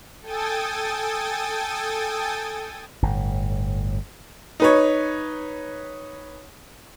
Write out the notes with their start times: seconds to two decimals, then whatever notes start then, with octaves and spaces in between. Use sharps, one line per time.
0.22 A4 G5 G#5 D#6 A6
3.02 G1 A2
4.60 D#4 B4 C#5